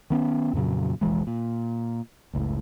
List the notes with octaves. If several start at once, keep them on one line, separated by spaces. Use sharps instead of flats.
D#3 B3 C#4
F2 A#2 C#3 F#3
F1 A#1 E3 G#3
A#2
F#1 C#2 A2